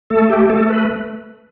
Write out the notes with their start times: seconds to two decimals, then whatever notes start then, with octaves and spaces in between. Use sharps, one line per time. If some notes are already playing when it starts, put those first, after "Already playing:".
0.10 A3 A4
0.30 G4
0.50 A3 A4
0.69 B4